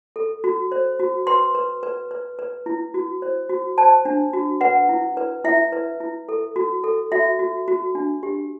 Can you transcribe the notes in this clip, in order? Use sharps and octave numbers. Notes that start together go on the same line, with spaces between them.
A4
F#4
C5
F#4
B4 C6
B4
B4
B4
B4
E4
F#4
C5
F#4
C5 A5
D4
F#4
B4 F#5
E4
B4
E4 E5
B4
E4
A4
F#4
A4
F#4 E5
F#4
F#4
D4
G4